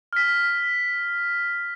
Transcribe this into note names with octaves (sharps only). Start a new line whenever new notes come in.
F6 B6